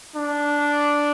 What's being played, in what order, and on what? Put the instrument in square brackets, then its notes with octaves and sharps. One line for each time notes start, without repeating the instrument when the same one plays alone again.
[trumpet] D4